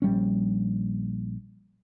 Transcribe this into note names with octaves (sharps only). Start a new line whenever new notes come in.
A#1 G3 C#4